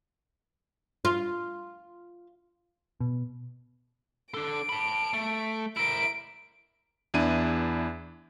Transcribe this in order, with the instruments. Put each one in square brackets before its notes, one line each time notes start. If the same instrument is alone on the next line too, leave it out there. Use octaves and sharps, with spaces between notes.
[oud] F4
[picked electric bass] B2
[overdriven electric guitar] D4 A4 [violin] D7
[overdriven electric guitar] A5 B5
A3
[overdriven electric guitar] E4 A#4 [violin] D7
[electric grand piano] E2 D4 E4 D#7